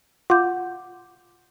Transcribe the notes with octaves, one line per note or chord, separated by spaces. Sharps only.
F4 F#5 D6 G6